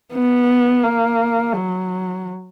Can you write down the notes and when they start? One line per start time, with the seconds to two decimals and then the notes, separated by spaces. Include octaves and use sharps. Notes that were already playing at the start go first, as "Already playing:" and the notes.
0.13 B3
0.84 A#3
1.54 F#3